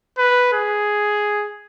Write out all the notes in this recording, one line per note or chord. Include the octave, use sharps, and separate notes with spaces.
B4
G#4